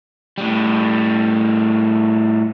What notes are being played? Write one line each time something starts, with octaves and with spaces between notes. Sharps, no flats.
A2 G3